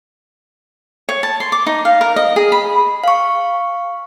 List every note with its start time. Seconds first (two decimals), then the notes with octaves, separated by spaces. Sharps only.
1.09 C#5
1.23 A5
1.40 C6
1.52 D6
1.67 D#4
1.85 F5
2.01 A#4
2.16 D#5
2.36 G#4
2.52 B5
3.04 F5 C#6